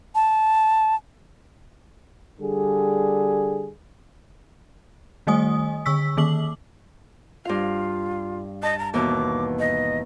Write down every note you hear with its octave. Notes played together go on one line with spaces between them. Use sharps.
A5
D3 G3 G#4
D#3 G3 A3 D#5 G#5 D#6
D3 C#6 E6 B6
D#3 A#3 D6 F#7
G2 F4 F5
D#5 A5
A#5
D#2 B2 E3 D6
D#5